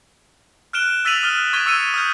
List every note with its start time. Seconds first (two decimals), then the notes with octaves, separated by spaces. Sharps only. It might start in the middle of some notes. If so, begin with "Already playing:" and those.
0.73 F6 F#6 D7 E7 G7
1.05 E6 A6 B6 D#7 F7 F#7
1.23 D#6 F6 G7
1.53 C#6 G#6 B6 D#7 G7
1.66 C#6 E6 G#6 C#7 D#7
1.94 D#6 F6 G6